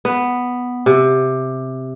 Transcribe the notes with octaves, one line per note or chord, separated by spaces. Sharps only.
B3
C3